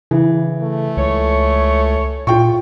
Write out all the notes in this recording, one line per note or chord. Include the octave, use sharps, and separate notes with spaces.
C#3 E3
A3
C#2 C#5
A#2 F4 G5 C#6